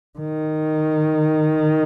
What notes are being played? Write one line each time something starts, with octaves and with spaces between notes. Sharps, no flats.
D#3